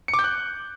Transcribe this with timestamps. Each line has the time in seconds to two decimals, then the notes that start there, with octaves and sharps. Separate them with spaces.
0.08 C#7
0.14 D6
0.19 G6
0.24 F#6